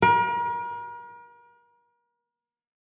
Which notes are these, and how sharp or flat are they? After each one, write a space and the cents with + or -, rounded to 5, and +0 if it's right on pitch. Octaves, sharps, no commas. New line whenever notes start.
A#4 +40